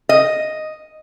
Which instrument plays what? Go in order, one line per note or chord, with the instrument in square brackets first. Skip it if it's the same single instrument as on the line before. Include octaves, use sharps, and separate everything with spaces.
[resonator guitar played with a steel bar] D#5